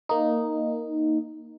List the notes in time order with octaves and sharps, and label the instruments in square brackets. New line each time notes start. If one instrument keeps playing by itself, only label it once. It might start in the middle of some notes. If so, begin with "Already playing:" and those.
[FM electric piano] A#3 D#4